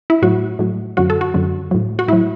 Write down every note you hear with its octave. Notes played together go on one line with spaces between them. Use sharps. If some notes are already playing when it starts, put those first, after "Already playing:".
E4
A2 F#3 F#4
A2 F#3
F#2 D3 F#3 F#4
A4
F#4
F#2 D3 F#3
A2 F#3
F#4
A2 F#3 E4